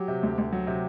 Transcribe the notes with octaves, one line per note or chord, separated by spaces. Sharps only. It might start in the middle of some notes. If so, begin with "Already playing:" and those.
Already playing: F#3 G4
C3
D2
D2
F#3
C3